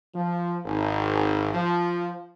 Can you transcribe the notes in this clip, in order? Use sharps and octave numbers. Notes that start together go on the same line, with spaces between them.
F3
G#1
F3